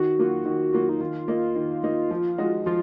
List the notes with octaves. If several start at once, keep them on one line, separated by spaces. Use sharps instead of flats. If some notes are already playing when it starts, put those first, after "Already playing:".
Already playing: D#3 F#4
F#3 A#3 F4
D#3
F#3 A#3 F4
D#4
D#3 F4
A#3 D#4
D#3
A#3 D#4
F3
G#3 D#4 F#4
F3 F4